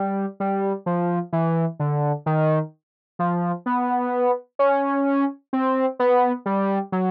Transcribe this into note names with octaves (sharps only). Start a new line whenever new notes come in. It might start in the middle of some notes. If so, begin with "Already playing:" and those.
Already playing: G3
G3
F3
E3
D3
D#3
F3
B3
C#4
C4
B3
G3
F#3